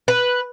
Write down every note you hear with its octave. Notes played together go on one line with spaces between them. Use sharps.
B4